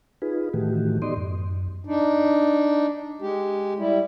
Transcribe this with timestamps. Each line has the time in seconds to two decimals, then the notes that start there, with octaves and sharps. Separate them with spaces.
0.22 D#4 F4 G#4 B4
0.54 A2 D#3 E3 A3 F#4 G4
1.02 B3 D#4 G4 D5 D#5 C6
1.17 F#2
1.85 D4 D#4
3.21 G#3 G4
3.78 G3 E4